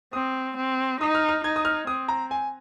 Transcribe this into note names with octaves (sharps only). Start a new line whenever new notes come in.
C4 D#6
C4
D#4 D#6
F6
F6
D#4 G#6
D#6
F6
C4 D#6
A#5
G#5